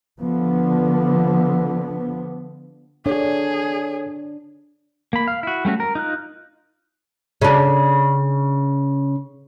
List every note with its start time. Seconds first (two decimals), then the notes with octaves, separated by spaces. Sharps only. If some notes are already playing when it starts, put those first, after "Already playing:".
0.21 D3 F3 B3
3.06 D4 G#4 A4 C#5
5.13 A#3 B5
5.28 F5
5.43 E4 F#4
5.65 G3 A3 C#4 F#4
5.80 A#4
5.95 D#4 F4 F#6
7.41 C#3 D4